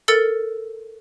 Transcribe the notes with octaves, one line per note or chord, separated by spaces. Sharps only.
A4 A#4 E6 A6 C#7